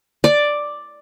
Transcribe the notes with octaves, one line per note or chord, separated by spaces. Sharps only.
D5